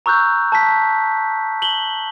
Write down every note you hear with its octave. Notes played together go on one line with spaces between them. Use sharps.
A#5 C#6 E6 F#6 G6
A5 B6
F#7 G7